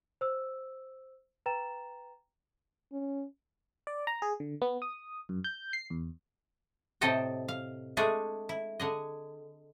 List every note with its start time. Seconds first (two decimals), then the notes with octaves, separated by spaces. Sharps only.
0.21 C5 E6
1.46 B4 G5 A#5 A6 E7
2.92 C#4
3.87 D5
4.07 A#5
4.22 G#4
4.40 D3
4.62 B3
4.82 D#6
5.29 F#2
5.44 G6
5.73 C7
5.90 E2
7.01 A2 C3 C4 A4 D#5 G5
7.48 F5
7.97 G#3 A3 D4 G#4
8.49 E4
8.80 D3 G#4 D#5